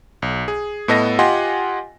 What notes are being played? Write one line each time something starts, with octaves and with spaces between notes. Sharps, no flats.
B1
G#4
A2 B3 A4 D#5 A#6
F4 G4 D#5 F#5 G#5 C6